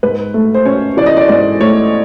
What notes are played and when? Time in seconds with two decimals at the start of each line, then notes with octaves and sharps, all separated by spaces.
0.03 G#2 B4
0.34 A3
0.54 C5
0.65 C#4 C#5
0.97 E3 D5
1.06 D#5
1.17 D5
1.28 G#2 D5
1.60 A3 C#5